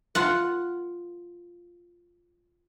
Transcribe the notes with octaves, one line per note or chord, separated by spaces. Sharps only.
F4 F#5